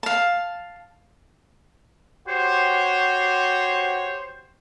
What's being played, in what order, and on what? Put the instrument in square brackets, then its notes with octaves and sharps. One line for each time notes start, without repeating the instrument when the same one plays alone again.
[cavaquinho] F5 A5
[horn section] F#4 G4 C#5 [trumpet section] C5